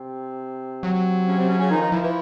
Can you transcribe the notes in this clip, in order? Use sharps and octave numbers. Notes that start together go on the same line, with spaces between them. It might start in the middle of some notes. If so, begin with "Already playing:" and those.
Already playing: C3 C4
F#3
C#3 C#4
C3 C4
C#3 C#4
C#3 C#4
D#3 F3 D#4
D#3 D#4
E3 F3 E4
E3 E4